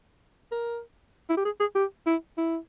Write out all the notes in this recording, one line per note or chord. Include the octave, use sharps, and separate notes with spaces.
A#4
E4
G4
G#4
G#4
G4
E4
E4